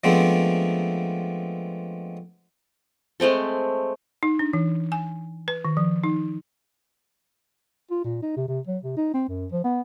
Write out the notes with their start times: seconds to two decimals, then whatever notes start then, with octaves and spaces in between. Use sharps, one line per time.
0.04 F3 G#3 A3 B3 C4 D4
3.20 G#3 A3 C4 A4
4.23 D#4
4.39 D4
4.53 E3
4.92 G#5
5.48 B4
5.65 D#3
5.77 F3
6.04 D#4
7.91 F4
8.04 A#2
8.23 D#4
8.37 C3
8.48 C3
8.67 F#3
8.83 C3
8.97 D#4
9.14 C4
9.29 F#2
9.52 F3
9.64 B3